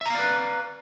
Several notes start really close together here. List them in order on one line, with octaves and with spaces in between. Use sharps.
E5 A#5 F5 D5 B4